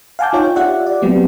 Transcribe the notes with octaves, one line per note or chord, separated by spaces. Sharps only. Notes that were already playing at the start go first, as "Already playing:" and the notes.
F5 F#5 G#5 A5 D6 G6
D#4 F4 C#5 G5
F4 G4 D5 E5 F#5
D5
F#3 B3 C4 G4